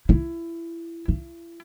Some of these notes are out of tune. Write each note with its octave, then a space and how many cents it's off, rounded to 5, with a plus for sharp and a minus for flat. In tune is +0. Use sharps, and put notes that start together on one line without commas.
E4 +25
E4 +35